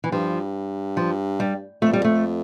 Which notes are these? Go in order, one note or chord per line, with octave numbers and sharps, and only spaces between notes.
E3
G2 F3
F3
G3
F2 A3
G3
A3